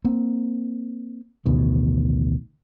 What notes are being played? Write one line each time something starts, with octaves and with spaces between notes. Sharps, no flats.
A#3 C4
A1 D2 B2 D#3